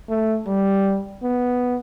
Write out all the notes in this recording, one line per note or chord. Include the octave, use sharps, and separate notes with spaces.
A3
G3
B3